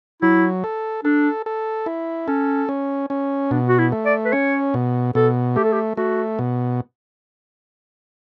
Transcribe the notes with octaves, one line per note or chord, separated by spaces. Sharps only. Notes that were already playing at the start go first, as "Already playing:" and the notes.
F#3 E4
A4
D4 A4
A4
E4
C#4 A4
C#4
C#4
B2 D4
F#4
E4
A3
D5
B4
C#4 C#5
B2
B2 A4
A3 G4
A4
G4
A3 F#4
B2